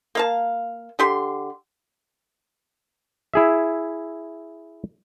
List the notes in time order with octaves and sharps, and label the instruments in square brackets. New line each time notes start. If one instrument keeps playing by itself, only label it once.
[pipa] A#3 F5 A5
D3 G4 C6
[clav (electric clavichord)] E4 G#4 E5